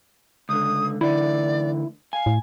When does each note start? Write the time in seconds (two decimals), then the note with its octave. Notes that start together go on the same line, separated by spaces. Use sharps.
0.49 C#2 D3 D#6
1.01 D2 D3 E3 E4 D5
2.13 F5 G#5
2.26 A2